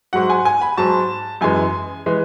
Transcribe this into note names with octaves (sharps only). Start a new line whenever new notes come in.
G#2 F#3 F#5
G#5
G#5
B5
G#2 F#3 A5
F#2 E3 G#3 G#5
E3 G#3